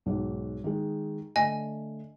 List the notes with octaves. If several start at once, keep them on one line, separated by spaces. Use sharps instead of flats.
B1 G#2
D#3 G#3
D3 A3 D#5 G#5